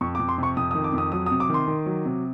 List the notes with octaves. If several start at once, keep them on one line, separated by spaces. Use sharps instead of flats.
F2 C#6
D6
F2
C6
C3 C#6
F2 D#6
D#6
D#3
D6
F2 D#6
F#3 D#6
D#6
C3
D6
D#3 C6
D#3
F#3
C3